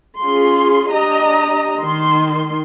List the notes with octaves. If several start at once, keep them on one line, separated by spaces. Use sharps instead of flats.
C#4 F4 G#4 C6
D4 G4 D#5 A#5
D#3 C6